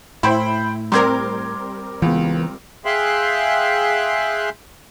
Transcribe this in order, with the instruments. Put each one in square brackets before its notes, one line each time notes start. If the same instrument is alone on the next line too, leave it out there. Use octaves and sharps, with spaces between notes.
[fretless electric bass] A2 [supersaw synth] E4 [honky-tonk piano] C5 G5 B5
[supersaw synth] G3 C4 A#4 [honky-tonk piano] C6 D6 G#6
[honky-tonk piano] C#2 [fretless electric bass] E3 B3
[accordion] G#4 E5 F5 G5 C6 F#6